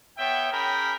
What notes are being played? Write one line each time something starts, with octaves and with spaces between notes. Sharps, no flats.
B3 C#5 E5 G5
C#4 G#4 A#4 G5 B5